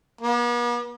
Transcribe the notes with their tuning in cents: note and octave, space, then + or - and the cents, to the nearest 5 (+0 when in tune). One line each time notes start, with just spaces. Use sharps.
B3 -45